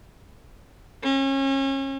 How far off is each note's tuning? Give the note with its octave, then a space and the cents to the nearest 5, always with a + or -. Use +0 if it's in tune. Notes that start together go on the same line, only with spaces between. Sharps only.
C#4 -30